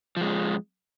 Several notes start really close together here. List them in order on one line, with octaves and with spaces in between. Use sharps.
F3 G#3 F2